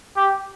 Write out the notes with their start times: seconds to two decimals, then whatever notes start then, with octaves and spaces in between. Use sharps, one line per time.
0.17 G4